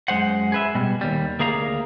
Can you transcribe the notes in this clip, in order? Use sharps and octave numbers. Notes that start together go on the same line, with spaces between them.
F#2 G#3 C5 F#5
G#4 B4 E5
B2 G3
D#2 G3
D2 A#3 G#4 F5 A#5